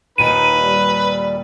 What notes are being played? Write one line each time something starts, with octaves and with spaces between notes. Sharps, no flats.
D#2 A#2 D#4 B4 D#7
G3